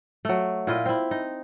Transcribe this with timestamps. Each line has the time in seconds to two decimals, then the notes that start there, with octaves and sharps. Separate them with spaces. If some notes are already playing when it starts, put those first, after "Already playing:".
0.25 F#3 A3
0.67 A#2 E4 F4 D#5
0.86 C4 E4
1.11 D#4